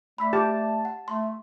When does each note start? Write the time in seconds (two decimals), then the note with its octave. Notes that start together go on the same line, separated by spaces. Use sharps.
0.18 A3 D5 B5 E6 B6
0.33 G4 A5
0.85 F#5
1.08 A3 C6